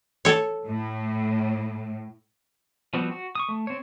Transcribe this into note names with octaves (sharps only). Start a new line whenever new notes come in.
A4 C#5
A2
F3 G3 B3 C4 F#4
F#4
C#6 D#6
A3
C4 C#5